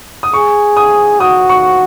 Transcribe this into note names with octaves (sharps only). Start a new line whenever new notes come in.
D#6
G#4 C#6
D#6
F#4 D#6
C#6